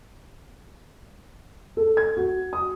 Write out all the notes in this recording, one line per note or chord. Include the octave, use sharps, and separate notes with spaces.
A4
G#6
F#4
D#6